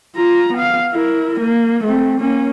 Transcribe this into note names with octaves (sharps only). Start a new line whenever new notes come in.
F4 A#5
B3 F5
E4 A#4
A#3
A3 C4
A#3 C#4